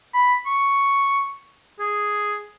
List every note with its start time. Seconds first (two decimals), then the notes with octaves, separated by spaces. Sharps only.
0.14 B5
0.46 C#6
1.79 G#4